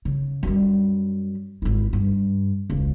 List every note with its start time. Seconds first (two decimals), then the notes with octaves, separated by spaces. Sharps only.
0.05 C#3
0.43 F#2 G3
1.62 G#1 E4
1.93 G2
2.70 E1 C#2